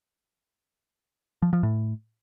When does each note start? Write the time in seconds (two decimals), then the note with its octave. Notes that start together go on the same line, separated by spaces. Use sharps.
1.42 F3
1.53 F3
1.63 A2